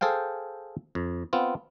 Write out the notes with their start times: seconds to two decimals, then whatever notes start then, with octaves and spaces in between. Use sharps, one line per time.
0.01 G#4 A4 C5 F5 G5
0.95 F2
1.33 B3 C4 F4